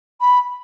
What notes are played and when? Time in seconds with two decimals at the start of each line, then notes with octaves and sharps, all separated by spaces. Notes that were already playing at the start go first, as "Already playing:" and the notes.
0.21 B5